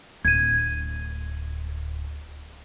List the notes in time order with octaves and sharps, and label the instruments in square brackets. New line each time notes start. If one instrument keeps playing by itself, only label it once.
[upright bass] D1 [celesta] G#6 D#7